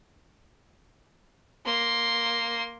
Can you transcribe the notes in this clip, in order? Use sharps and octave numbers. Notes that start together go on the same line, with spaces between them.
A#3 C6